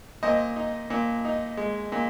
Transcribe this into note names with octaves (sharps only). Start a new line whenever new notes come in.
A#2 C5 D#5
D#4
A#2
D#4
G#3
A#2